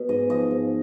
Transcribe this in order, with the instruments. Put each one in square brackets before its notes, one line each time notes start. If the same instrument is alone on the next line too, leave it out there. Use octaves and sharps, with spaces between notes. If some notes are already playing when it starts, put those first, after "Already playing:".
Already playing: [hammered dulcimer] B2
G#2 D#5
F3 D#5
G#2